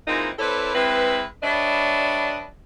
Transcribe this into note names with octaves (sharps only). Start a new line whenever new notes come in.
E3 G#3 A#3 C4 D#4 F4
C4 E4 A4 B4 C#5 D5
G#3 C4 E4 B4
G3 D4 B4 C#5 D#5 E5